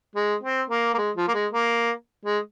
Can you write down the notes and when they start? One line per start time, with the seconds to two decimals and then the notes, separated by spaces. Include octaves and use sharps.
0.16 G#3
0.43 C4
0.70 A#3
0.94 A#3
0.98 G#3
1.17 F3
1.28 A#3
1.34 G#3
1.53 A#3
2.26 G#3